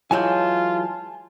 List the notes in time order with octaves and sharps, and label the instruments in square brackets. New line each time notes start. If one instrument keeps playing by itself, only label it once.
[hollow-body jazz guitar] E3 F#3 G#3 [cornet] F4 [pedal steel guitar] G#5 A5 G6